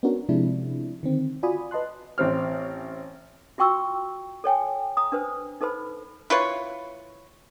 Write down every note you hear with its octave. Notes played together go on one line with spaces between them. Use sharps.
B3 C#4 D4 F#4 A#4
C3 F3 G#3 D4 E4
D3 D#3 C4
F4 F#4 D5 G#5 B5 D#6
B4 D#5 A5 C6 F#6
A1 C4 F6
F4 F#4 G5 C#6 E6
A4 C#5 G5 G#5
A#5 D#6
D4 B4 C5
D#4 A4 B4 C5 B5
E4 F4 B4 C#5